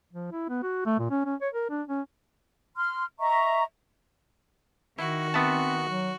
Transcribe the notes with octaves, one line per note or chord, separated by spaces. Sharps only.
F3
E4
B3
F#4
A3
A#2
C#4
C#4
C#5
A#4
D4
C#4
C6 F6
D#5 E5 A#5 C#6
D#3 E4 F#4
B3 C4 E5 A5
F#3